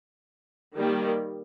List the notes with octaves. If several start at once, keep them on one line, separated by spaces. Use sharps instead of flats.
D#3 G3 A#3